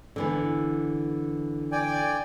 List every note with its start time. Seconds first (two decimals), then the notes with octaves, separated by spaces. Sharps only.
0.16 D3 E3 B3
1.72 D5 G5 G#5